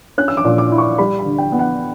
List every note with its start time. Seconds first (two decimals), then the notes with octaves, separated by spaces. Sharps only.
0.18 C#4 F#6
0.28 E6
0.37 D6
0.45 A#2
0.58 D6
0.72 E4
0.78 C#6
0.98 G3 B5
1.19 B5
1.26 D2
1.38 G5
1.52 B3
1.59 F#5